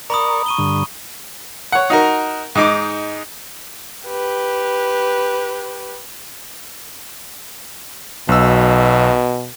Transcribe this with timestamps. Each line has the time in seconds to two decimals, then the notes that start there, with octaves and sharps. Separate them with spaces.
0.10 A#4 D5 A#5 B5 C#6 D#6
0.46 C#6 D#7 G7
0.58 G2 D3
1.72 C#5 F#5
1.90 D#4 F#4 A#4
2.55 G#2 D#4 D6
4.08 G4 B4
8.29 B1 B2 E6